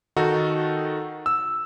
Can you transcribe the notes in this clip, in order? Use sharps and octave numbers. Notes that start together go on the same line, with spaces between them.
D#3 D#4 F#4 A4
E6